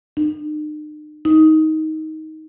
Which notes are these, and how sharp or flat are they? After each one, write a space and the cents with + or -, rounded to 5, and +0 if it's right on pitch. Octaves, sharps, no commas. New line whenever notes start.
D#4 -45
D#4 +15